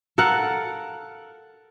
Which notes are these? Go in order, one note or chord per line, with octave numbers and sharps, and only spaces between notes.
A4 A#4 F5 F#5